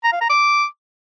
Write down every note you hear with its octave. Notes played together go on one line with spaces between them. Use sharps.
A#5
F5
A#5
D6